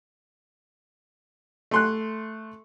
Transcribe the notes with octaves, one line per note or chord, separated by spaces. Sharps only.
A3 C6 F#6